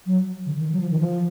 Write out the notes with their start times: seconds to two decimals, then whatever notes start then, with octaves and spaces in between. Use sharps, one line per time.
0.06 F#3
0.46 D3
0.59 D#3
0.72 F#3
0.80 F3
0.90 D#3
0.99 F3